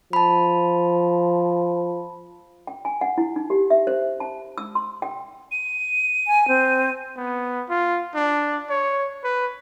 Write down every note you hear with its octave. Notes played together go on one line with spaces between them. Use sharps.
F3 A5 B5
G5
G#5
F#5
E4
D#4
G4
E5
C5
A5
E6
C6
G5
D#7
G#5
C4
B3
F4
D4
C#5
B4